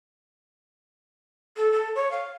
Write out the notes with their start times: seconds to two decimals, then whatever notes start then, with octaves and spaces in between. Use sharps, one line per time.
1.57 A4
1.72 A4
1.95 C#5
2.11 F5